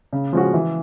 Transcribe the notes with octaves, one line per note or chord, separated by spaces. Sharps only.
C#3
F3 G#3 C#4 F#4
E3